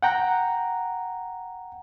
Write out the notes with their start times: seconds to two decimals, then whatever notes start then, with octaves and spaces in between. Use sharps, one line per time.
0.03 F#5 G5 A#5